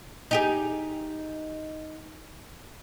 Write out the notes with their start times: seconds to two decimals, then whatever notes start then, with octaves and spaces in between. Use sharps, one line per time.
0.31 D#4 G4 G#4